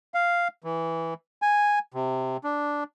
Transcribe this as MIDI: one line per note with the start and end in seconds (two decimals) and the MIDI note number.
0.14 0.48 77
0.64 1.14 52
1.42 1.79 80
1.94 2.37 48
2.44 2.84 62